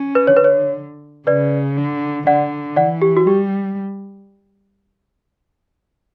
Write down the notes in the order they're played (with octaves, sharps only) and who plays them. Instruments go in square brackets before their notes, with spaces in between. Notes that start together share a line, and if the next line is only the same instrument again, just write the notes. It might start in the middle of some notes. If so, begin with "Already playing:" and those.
Already playing: [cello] C#4
[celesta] B4
[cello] D3 [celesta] C#5
[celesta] B4
C#5
[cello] C#3 [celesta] B4 D5
[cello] D3
[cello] D3 [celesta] D5 F#5
[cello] E3 [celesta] D5 F#5
[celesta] G4
F#4
[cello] G3 [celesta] G4